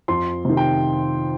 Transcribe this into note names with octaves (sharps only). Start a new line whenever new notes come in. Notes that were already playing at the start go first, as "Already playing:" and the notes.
F2 C6
C3 D#3
G5